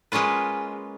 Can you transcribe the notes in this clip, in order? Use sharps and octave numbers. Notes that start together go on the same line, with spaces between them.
G#3 A#3 C#4 F4 B4